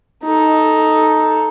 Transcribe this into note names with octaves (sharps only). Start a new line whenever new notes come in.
D#4 A4